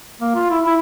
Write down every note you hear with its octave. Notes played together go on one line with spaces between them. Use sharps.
A#3
F4
E4
E4